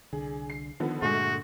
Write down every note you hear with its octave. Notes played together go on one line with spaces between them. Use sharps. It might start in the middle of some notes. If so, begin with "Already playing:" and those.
C2 D3 G#4
C7
D3 D#3 F3 B3
G2 A#2 D3 G#3 A3 F#4